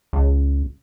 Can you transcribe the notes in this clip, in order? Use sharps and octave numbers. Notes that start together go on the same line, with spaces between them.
C#2